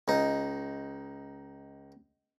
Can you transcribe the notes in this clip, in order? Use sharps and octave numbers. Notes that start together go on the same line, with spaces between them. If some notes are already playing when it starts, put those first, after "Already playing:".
C#2 D#4